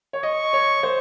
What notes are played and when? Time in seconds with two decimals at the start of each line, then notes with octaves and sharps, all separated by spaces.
0.13 C#5
0.23 D#5 C#6
0.53 C#5
0.83 C5